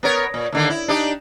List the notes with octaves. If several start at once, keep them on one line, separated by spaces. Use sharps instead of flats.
B3 A#4 C#5
A#2
D#2 D3 A#3
E4
D4 D#4 G4